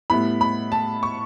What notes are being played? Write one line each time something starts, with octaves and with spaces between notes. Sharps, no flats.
A2 G3 B3 E4 B5
B5
A5
C#6